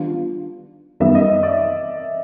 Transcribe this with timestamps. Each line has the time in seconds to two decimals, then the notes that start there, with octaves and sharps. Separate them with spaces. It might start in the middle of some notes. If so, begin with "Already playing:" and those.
Already playing: D#3 G3 B3 D4 F4
1.00 F#2 D#3 G3 B3 E5
1.15 D#5
1.29 D#5
1.43 D5
1.58 D#5